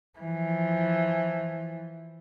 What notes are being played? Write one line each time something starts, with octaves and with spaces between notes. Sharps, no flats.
E3 F3